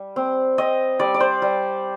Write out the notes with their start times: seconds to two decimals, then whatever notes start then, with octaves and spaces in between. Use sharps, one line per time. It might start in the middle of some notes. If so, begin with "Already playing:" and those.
Already playing: G3
0.16 C4
0.58 C4 D#5
0.99 G3 D5
1.14 D5
1.20 C5
1.42 G3